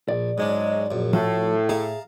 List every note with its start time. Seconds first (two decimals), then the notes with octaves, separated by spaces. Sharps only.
0.09 A#1 D5
0.38 G#2 F#3 G#3 C#4 D4
0.91 A#1 F#2
1.13 A2 F3 A3 F#4 A5
1.69 G#4 E5 F5 A5 A#5